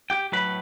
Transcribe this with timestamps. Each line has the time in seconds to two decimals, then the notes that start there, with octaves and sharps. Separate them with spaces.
0.10 G4 G5
0.32 A2 F#3 A3 B4 B5